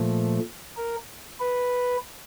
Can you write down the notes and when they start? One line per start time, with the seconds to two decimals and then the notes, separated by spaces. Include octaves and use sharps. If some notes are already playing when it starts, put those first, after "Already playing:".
Already playing: A#2 F3 A3
0.77 A#4
1.40 B4